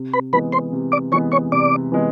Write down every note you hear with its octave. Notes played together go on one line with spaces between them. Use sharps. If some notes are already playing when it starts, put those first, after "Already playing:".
Already playing: C3
B4 B5
E3 G#3 B3 B4 B5
C5 C6
C3
D5 D6
E3 G#3 B3 C#5 C#6
C#5 C#6
C3 D5 D6
E3 G#3 B3